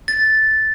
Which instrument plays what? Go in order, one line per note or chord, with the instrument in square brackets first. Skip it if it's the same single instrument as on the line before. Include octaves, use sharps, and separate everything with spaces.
[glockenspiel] A6